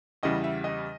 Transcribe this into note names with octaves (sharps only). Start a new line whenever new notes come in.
E2 C#3 E3 G3 D#5
E5
D#5